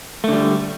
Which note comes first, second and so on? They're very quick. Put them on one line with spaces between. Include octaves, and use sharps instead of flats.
A3 D3 G3